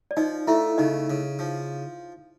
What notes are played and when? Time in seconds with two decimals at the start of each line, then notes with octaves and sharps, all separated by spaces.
0.11 D5
0.17 F3 D#4 D#5
0.47 A3 E4 E5
0.78 C#3 D#4 D#5
1.10 C#3
1.39 F3